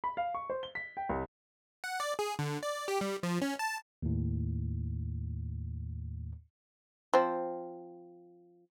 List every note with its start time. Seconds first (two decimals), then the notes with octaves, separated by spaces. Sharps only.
0.04 B5
0.17 F5
0.35 C#6
0.50 C5
0.63 G7
0.75 B6
0.97 G5
1.09 C2
1.84 F#5
2.00 D5
2.19 G#4
2.39 D3
2.63 D5
2.88 G4
3.01 G3
3.23 F3
3.42 C#4
3.59 A5
4.03 D#2 A2
7.14 F3 C4